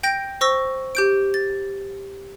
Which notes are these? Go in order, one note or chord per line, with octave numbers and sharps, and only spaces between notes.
G5 G6 A#6 D7
C5 C#6 E6 A#6
G4 G6 D7
A6